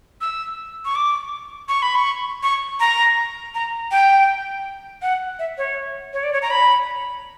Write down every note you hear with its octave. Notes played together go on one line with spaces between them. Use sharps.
E6
C#6
D6
C#6
B5
C#6
C#6
A#5
A#5
G5
F#5
E5
C#5
C#5
D5
C#5
A#5
B5